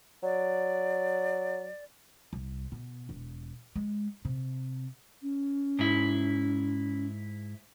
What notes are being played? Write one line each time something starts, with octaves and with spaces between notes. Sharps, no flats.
F#3 D5
C2
B2
E1
G#3
C3
C#4
G#2 E4